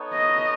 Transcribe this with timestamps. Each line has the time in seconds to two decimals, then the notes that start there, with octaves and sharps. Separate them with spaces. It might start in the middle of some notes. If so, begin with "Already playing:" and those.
Already playing: B3 D#4 A4 C#5
0.14 D#5